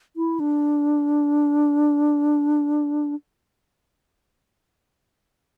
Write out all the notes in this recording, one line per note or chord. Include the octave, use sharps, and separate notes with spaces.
E4
D4